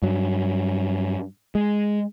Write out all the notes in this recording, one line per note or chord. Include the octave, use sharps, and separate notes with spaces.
G2 F#3
G#3